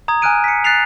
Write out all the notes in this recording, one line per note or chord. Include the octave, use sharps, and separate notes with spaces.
A#5 D#6 G#6
G#5 A#5 F6 F#6 D7 D#7
B6 C#7
F#6 A6 B6 C7 F7